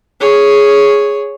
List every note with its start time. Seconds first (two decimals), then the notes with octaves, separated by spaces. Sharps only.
0.21 G#4 C#5